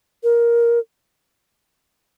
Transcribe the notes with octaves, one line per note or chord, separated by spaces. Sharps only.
A#4